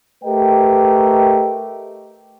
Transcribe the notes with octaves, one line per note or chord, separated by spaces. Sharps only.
A3 G4 A#4 B4 D#5 G5